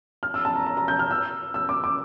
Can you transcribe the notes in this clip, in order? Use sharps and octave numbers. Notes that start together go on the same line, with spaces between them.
F6
E6
A5
A#5
A#5
A#5
G6
F6
E6
E6
D6
D6